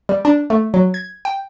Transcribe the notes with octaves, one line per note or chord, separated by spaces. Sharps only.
G3
D4
A3
F#3
G#6
G5